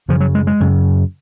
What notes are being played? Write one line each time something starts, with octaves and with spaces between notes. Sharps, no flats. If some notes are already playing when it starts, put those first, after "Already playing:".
F#2 C#3 F3
F#3
G#3
G#3
F#2 C#3